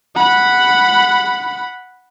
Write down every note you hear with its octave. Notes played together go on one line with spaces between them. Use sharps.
F#5 B5